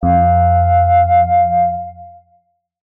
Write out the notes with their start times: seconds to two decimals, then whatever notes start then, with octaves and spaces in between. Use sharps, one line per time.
0.03 F2 F5